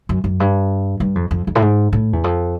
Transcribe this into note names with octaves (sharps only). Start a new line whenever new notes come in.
F#2
F#2
G2
G2
F2
F2
F2
A2
G#2
A2
E2
F2